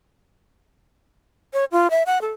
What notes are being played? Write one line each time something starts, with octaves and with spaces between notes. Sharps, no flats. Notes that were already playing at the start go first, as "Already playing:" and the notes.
C#5
F4
E5
F#5
A4